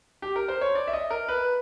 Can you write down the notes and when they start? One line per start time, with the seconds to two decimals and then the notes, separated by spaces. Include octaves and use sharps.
0.22 G4
0.36 A#4
0.48 C5
0.61 C#5
0.75 D5
0.87 E5
0.93 D#5
1.10 A#4
1.29 B4